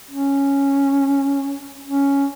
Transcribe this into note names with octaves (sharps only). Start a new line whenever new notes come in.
C#4
C#4